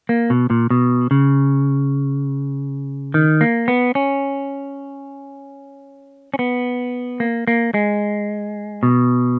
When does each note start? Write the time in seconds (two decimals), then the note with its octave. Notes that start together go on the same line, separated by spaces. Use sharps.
0.09 A#3
0.30 B2
0.50 A#2
0.70 B2
1.11 C#3
3.14 D#3
3.41 A#3
3.68 B3
3.95 C#4
6.34 C#4
6.39 B3
7.20 A#3
7.48 A#3
7.74 G#3
8.83 B2